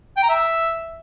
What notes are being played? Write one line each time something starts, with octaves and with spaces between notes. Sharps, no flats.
G5
A#5
E5